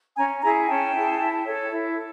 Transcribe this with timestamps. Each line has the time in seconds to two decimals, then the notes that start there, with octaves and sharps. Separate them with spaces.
0.17 C#4 G#5 A#5
0.42 E4 G#4 G#5 A#5
0.68 C#4 G5 A5
0.94 E4 G#4
1.18 E4
1.44 A4 C#5
1.70 E4
1.95 A4